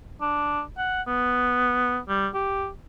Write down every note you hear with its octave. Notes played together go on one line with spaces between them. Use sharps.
D4
F#5
B3
G3
G4